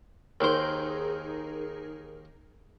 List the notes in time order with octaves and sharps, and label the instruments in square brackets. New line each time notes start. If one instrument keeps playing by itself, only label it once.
[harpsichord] D#2 C5 [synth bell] D#4 G#4 A#4